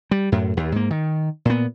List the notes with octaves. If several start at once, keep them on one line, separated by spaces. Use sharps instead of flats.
G3
F#2 A2
D#2
G#2 A#3
D#3
A#2 B3